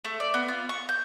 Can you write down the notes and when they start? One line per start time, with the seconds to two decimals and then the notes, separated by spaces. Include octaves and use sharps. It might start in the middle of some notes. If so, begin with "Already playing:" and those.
0.05 A3
0.20 D5
0.34 B3
0.48 F4
0.69 C#6
0.89 G6